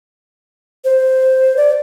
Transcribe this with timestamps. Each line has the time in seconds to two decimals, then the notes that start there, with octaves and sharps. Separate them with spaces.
0.85 C5
1.57 D5